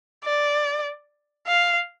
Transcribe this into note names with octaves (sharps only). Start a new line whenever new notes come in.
D5
F5